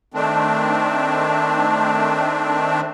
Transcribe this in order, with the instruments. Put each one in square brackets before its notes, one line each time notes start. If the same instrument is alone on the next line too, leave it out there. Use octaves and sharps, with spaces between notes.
[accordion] D#3 A3 C4 D4